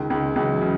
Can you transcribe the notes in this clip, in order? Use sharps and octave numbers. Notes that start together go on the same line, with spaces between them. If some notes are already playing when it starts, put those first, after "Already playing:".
Already playing: C#2 D#3
C#2
C#2 E3 F#3
C#3